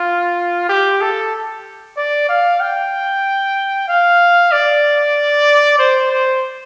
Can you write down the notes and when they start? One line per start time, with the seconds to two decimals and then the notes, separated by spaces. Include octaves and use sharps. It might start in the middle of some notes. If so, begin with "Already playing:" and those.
Already playing: F4
0.69 G4
1.01 A4
1.97 D5
2.29 F5
2.60 G5
3.88 F5
4.52 D5
5.79 C5
6.11 C5